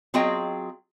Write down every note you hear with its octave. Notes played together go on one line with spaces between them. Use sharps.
F#3 C4 F4 G#4 D#5 G5